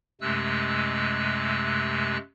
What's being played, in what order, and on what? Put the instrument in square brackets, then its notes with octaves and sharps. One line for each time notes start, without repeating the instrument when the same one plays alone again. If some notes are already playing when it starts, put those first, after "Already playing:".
[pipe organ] F#2 C3 G#3 A3 E6 F#6